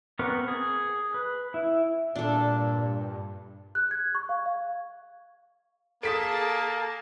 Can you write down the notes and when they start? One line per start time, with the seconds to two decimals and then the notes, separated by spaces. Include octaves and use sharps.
0.19 B3 C4 A#4 B4 C#6
0.48 G#4
1.14 B4
1.54 E4
2.16 G2 A#2 D4 A4
3.75 F#6
3.91 G#6
4.15 C#6
4.29 F5
4.46 F5
6.03 A#3 G#4 A4 A5 D#6 B6 D7